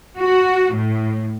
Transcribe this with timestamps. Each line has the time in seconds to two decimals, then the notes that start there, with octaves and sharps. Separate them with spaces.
0.19 F#4
0.75 A2